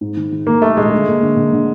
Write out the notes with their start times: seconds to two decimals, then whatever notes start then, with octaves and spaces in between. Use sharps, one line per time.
0.01 G#2
0.17 D#3
0.32 D#3
0.47 D#3 A#3
0.62 G3 A3
0.77 A#1 G#3
0.93 D3
1.07 A#3
1.23 D3
1.37 D3
1.53 D3